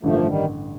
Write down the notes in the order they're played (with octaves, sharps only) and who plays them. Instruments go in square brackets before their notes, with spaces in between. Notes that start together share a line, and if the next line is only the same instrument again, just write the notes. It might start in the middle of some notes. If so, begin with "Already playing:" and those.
[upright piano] A1 G2 D3 [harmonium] F3 A3
[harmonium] A#3
A3
D#3 G3